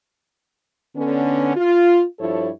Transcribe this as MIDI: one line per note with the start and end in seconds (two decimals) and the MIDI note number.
0.96 1.52 50
0.96 1.52 59
0.96 1.52 61
1.56 2.04 65
2.19 2.49 43
2.19 2.49 53
2.19 2.49 64
2.19 2.49 69
2.19 2.49 73